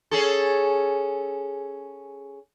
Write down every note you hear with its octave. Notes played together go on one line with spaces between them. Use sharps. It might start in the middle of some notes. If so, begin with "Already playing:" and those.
C#4 G#4 A4